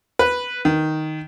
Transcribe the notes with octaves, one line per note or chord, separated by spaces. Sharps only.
B4
D#3